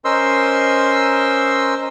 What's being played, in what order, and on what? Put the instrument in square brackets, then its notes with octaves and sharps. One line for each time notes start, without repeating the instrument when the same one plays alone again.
[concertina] C#4 A#4 C5 D#5 C6 E6